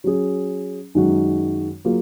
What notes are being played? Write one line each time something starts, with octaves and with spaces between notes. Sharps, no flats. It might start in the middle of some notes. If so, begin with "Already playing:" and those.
F#3 C#4 G#4
F#2 D#3 G#3 D#4 F#4
F#3 A#3 F4 G#4